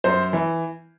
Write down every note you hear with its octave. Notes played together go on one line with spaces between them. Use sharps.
F#2 C5
E3